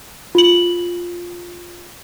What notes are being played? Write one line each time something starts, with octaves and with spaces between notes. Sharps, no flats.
F4 F#7